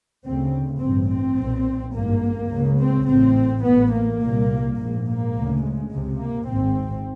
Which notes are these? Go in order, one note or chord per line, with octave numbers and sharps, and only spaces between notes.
D2 C#3 C4
A1 G2 C4
C4
B1 A#2
G#1 G2 A#3
C#2 C#3
C4
A1 A2 C4
A1 A2 B3
A#3
C2 A#2
A#1 G#2
A#3
D2 C#3
G#3
C#2 C3
A#3
G#1 G#2 C4